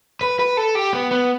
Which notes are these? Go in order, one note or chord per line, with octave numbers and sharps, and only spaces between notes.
B4
B4
A4
G4
B3
B3